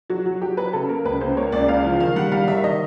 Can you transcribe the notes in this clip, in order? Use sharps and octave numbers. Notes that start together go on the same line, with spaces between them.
F#3 F#4
F#3
F#3 G4
F#3 B4
C#3 A4
A#3 A#4
C#2 B4
C#2 C5
A#3 C#5
C#2 D5
C#2 F5
F3
D#3 F5
G3 F#5
G3 F5
D#3 E5
D#3 D#5